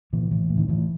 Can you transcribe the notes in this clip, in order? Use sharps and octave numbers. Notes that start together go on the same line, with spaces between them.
A#2 E3
A2 E3
A2
D#3
A2 E3